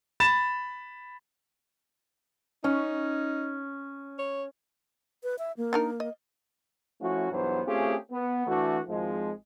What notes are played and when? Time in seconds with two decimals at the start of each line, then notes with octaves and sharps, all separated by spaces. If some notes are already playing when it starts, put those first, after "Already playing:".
0.20 B5 A6 E7
2.64 C#4 D#4
4.19 C#5
5.23 B4
5.39 E5
5.57 A#3
5.73 D4 D#4 A#4
6.00 D#5
7.01 F3 A3 C#4 E4 F#4
7.31 B1 G2 E3 F#3 B3 C5
7.67 A3 C4 C#4 F4 G4 G#4
8.11 B3
8.46 E3 A3 D4 F#4
8.87 G#1 F3 G#3